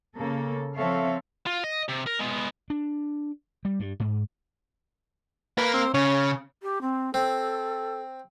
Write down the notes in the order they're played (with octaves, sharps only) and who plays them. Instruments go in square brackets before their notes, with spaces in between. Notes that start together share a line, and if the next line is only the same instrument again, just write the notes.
[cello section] C#3 A#3 A4
F3 C4 A4 C#5 E5 F5
[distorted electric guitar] F4
D#5
C3
A#4
G#3 B3
[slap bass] D4
G3
G2
G#2
[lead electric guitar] A#3 A#4 [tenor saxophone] B4
[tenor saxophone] C4
[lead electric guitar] C#3 [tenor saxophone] C#4
[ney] G4
C4
[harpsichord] C4 [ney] A4